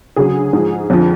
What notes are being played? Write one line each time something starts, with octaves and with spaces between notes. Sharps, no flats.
D2 C#3 F#3 G#4
G#2 F3
F2 D3 F3